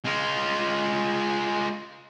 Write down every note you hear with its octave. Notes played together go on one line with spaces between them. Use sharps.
G#3 F4